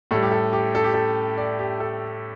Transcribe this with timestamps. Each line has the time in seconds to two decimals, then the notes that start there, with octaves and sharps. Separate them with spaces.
0.11 A2 G3 A4
0.23 G4
0.31 A4
0.53 G4
0.75 A4
0.84 G4
0.94 A4
1.38 D5
1.59 G4
1.80 A4